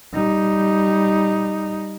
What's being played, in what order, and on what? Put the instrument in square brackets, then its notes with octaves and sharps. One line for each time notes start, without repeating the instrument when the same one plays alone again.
[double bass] G3 D#4